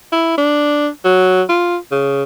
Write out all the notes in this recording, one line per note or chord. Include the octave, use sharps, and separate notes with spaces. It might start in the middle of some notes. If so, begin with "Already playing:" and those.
E4
D4
F#3
F4
C#3